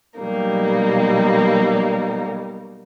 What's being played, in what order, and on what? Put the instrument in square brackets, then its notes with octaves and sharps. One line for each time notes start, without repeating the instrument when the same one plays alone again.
[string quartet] B2 F#3 G3 A#3 D#4